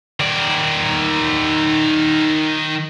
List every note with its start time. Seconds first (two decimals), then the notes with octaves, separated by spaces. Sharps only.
0.20 D#3 D5